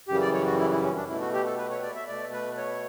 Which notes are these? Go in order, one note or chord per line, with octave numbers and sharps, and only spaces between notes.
F#2 C#3 E3 G3 G4
D5
C#5
F#4
E4
E4
C#4
D4
B2 A3 E4
F#4
G4
A4
B4
C#5
D5
E5
B2 A3 D5
B4
C#5